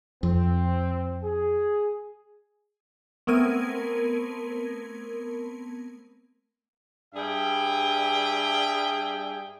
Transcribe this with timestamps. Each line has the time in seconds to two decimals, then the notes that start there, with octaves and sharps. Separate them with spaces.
0.23 F2 C4
1.24 G#4
3.27 A3 B3 C4 A#4 G#6 D#7
7.15 G2 G3 G#4 E5 G5